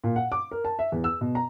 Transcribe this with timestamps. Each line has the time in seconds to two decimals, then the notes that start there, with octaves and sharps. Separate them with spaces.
0.04 A#2
0.16 F#5
0.32 D6
0.51 A#4
0.65 A5
0.79 E5
0.92 E2
1.04 E6
1.21 B2
1.35 A#5